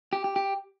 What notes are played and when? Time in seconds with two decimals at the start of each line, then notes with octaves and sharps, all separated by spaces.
0.13 G4
0.24 G4
0.36 G4